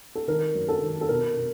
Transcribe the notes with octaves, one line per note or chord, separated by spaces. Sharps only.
A4
D#3 A#4
F#2
A4
D#3
A4
B2 A#4
B2